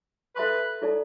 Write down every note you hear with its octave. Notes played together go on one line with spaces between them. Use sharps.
A4 B4 E5 A5 C6
E4 A4 D5 A5